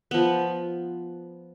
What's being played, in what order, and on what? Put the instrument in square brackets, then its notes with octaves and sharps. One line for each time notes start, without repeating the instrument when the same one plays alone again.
[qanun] F3 B3